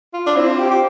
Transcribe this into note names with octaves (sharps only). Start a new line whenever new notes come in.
F4
D4
C4 E4
F4
G4
G4